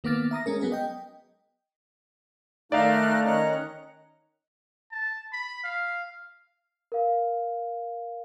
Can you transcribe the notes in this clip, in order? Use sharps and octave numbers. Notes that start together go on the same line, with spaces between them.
D#3 A#3 B3 D6 F6 A6
E5 A#5 D#6 A#6
G#3 C#4 A#4
F#3 B3 G#4 A#4
D#5 G5
D#3 A3 D#4 D5 E5 F5 F6 F#6
D#3 C#4 C#5 D#5 A#5 F#6
A5
B5
F5
A#4 F5